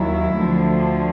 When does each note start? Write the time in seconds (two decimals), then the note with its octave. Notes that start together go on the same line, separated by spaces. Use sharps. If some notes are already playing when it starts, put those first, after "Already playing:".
Already playing: D#2 D#3 F#3 E4
0.34 D2 D3 F3